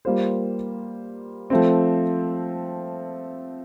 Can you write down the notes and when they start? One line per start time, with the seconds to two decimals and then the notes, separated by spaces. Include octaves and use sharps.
0.05 G3 A#3 F4 C5
1.50 F3 A3 C4